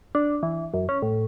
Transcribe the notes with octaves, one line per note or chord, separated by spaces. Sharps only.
D4
E3
F#2
C#4
A2